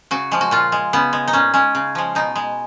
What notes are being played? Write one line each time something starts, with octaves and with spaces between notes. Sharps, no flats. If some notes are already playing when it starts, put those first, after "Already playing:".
C#3 F#4
F3 G#3
F#4
A#2 F4
G#3
C#3 B3
G#3
D#4
A#2 C#4
G#3 C#4
C#3
F3 G#3
B2 D#4
G#3